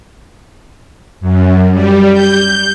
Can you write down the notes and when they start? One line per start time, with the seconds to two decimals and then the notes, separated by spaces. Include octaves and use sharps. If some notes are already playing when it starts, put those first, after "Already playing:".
1.21 F#2
1.71 G3
2.12 G6